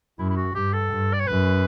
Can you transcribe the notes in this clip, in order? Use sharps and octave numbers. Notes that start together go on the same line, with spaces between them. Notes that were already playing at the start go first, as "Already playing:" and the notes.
F#2 E4
E4
F#4
G2 G4
A4
G2
D5
C#5
F#2 B4